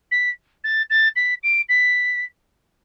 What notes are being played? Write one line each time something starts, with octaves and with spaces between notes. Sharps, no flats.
B6
A6
A6
B6
D7
B6